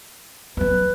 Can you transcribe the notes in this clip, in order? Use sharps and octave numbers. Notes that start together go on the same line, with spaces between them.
F#3 C#4 B4